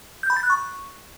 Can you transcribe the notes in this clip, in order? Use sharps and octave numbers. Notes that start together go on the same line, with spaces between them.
G6
B5
A6
F#6
C#6